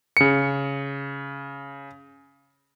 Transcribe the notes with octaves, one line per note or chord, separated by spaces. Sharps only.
C#3 C#7